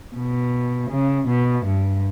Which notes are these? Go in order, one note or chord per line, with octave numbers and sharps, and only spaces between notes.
B2
C#3
B2
G2